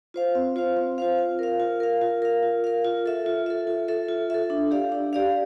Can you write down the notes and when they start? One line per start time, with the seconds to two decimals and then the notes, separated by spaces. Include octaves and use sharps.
0.14 F4 C5 F5
0.35 C4
0.56 F4 C5 F5
0.77 C4
0.98 F4 C5 F5
1.19 F4
1.39 A#4 F5
1.60 F4
1.80 A#4 F5
2.01 F4
2.22 A#4 F5
2.43 F4
2.64 A#4 F5
2.84 F4
3.06 A4 E5
3.26 F4
3.46 A4 E5
3.67 F4
3.88 A4 E5
4.09 F4
4.30 A4 E5
4.50 D4
4.71 G4 D5 F5
4.92 D4
5.13 G4 D5 F5